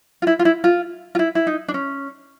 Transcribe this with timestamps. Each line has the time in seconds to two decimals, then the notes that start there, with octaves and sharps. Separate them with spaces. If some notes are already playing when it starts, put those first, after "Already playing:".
0.22 F4
0.27 E4
0.39 F4
0.45 E4
0.64 F4
1.15 F4
1.19 E4
1.35 E4
1.47 D#4
1.68 D4
1.74 C#4